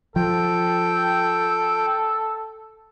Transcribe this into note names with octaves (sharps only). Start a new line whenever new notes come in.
F3 A4 G5